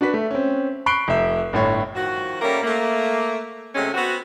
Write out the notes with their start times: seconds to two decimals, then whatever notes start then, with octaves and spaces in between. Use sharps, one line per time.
0.01 D4 F#4 B4 B6
0.14 A3
0.31 C4 C#4
0.86 B5 C#6 F#6 C7 D7 G7
1.08 F1 E5
1.53 G1 A2 C#5
1.95 D#3 F3 F#4
2.41 G3 A3 A#3 C#4 A#4
2.63 A3 A#3
3.75 C3 F#3 G#3 A3 C#4
3.94 B3 C4 F#4